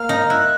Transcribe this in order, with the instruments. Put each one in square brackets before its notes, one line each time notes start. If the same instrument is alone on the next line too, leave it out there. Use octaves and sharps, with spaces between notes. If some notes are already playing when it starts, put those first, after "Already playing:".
Already playing: [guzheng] A#3 [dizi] F6
[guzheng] D#4
[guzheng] E4 [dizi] F#6